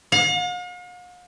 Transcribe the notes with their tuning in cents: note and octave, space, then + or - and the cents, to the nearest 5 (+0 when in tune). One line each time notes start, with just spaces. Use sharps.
F5 +45